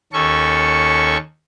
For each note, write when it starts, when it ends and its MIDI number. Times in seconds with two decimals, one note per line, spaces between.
0.13 1.17 39
0.13 1.17 61
0.13 1.17 69
0.13 1.17 85